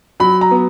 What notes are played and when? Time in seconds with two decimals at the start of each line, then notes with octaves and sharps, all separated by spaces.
0.20 F#3 B5
0.41 A#5
0.51 B3